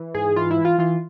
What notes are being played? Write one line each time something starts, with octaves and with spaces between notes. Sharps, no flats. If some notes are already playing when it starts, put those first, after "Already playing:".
Already playing: E3
G#2 G#4
E3 F4
E4
E3
F4
E3 F4